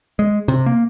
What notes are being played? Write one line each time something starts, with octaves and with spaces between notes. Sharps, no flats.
G#3
C3
A#3